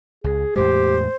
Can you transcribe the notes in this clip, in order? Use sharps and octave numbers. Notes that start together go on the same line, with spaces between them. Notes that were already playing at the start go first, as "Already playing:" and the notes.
C#2 G#4
E2 A2 G#3 G4 C5